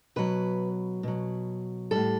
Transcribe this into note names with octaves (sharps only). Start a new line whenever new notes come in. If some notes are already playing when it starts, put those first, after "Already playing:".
B2 F#3 B4
B2 F#3
A2 G3 A4